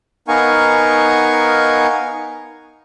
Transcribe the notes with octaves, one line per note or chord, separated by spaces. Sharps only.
B3 D#4 A#4 F5 G#5 C#6